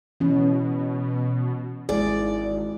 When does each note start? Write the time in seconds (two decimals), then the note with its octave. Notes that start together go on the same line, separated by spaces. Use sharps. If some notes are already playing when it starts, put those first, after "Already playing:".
0.20 B2 E3 C#4
1.89 G#1 G#3 E4 G#4 D5